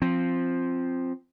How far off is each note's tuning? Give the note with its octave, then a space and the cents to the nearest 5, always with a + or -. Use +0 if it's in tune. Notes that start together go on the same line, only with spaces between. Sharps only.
F3 +0 C4 +5